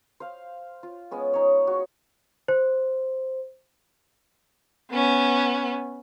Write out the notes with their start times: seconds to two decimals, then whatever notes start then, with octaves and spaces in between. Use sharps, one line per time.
0.20 C5 F5
0.83 F4
1.11 G#3 B3 C#4
1.34 D#4 C#5
1.67 F#4
2.48 C5
4.91 B3 C#4